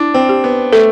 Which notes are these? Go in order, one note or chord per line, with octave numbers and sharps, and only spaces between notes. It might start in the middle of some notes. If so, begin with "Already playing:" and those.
Already playing: D4 E4
C4
G4
B3
A3 A4